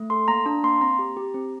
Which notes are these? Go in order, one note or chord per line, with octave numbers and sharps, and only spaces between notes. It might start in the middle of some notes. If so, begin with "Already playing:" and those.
Already playing: A3
A4 C6
A#3 A#5
D4 A#5
A#3 C6
C4 A#5
G4
G4
C4